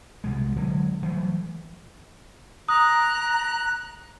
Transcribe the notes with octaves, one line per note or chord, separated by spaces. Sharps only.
C2 B2 G#3
D3 F#3 G#3
E3 F#3 G3 A3
A#5 D#6 F#6